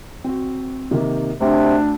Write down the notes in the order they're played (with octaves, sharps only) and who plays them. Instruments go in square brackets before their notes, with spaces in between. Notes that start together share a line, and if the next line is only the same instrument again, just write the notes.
[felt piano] C4 F#4
C3 D#3 A#3
[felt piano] D2 [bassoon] C3 [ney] D4